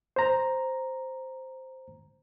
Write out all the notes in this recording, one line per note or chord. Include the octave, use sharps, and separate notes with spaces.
C5 A#5